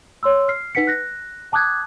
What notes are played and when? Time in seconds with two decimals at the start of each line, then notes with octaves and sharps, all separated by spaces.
0.23 C#5 C6 E6
0.48 F6 C7
0.75 D#4 B4 F#5 B6 C#7
0.87 F#6 A#6
1.52 G5 A5 D6 D#6 F#6 G#6